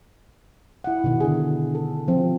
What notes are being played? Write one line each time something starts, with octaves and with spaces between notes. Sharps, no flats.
E4 F#5
B2 D#3
D3 G#4
A4
F3 C4